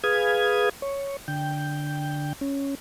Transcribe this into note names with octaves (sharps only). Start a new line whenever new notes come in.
G#4 B4 F5 D#6 G#6
C#5
D3 G5
C#4